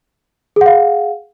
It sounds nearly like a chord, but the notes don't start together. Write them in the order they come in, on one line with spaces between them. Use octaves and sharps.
G#4 F#5 F5